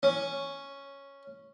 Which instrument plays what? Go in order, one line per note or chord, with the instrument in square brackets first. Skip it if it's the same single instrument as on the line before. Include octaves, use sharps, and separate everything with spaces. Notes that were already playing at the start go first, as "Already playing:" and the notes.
[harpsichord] C#4